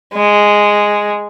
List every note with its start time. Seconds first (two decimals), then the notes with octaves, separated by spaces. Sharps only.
0.14 G#3